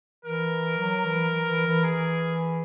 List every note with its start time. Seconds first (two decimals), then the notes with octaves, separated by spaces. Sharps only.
0.25 E3 A#4
0.78 F#3
1.05 E3
1.48 E3
1.67 E3
1.84 G#4